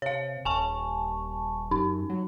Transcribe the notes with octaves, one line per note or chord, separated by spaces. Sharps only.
C3 C#5 F5
D#1 G#5 A5 C#6
F#2 D#4
F#3